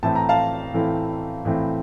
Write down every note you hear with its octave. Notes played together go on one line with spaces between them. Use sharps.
A2 E3 A3 C4 E4 A5
A#5
F5 A5
A2 E3 A3 C4 E4
A2 E3 A3 C4 E4